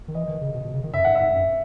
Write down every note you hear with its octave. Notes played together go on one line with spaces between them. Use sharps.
D#3
E3 D#5
D#3
C#3
B2
B2
C#3
D#3
F#2 E5
G#2 F#5
G#2 E5
F#2